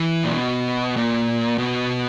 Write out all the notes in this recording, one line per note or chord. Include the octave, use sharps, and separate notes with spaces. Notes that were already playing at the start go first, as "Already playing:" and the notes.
Already playing: E3
A#2
B2
A#2
B2